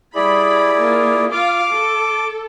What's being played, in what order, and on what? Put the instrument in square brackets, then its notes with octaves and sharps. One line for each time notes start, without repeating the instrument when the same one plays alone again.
[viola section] G3 B5 [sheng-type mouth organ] E4 G#4 D5
[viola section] A#3 F4
[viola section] F4 F5 [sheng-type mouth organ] D6
[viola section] A4